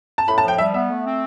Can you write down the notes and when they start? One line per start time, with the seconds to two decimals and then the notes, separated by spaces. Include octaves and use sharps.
0.18 A5
0.28 A2 B5
0.38 A5
0.43 F3
0.48 G5
0.58 G3 E5
0.74 B3 E5
0.89 A3
1.05 C4